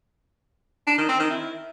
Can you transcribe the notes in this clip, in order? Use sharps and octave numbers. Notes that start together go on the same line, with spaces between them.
D4
D#3
C4
D#3
E4